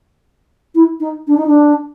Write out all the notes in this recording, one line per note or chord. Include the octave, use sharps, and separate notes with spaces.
E4
D#4
D4
D#4
D4